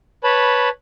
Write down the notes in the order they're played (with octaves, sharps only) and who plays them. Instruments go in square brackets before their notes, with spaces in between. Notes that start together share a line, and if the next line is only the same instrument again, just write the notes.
[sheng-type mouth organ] B4 C#5 A5 B5